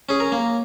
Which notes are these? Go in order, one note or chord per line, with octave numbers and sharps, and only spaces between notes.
C#4 G#4
A#4
A#3